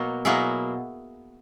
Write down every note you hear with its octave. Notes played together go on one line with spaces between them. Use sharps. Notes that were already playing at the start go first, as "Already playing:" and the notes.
Already playing: B2 F#3 A#3
B2 F#3 A#3 E4 G#4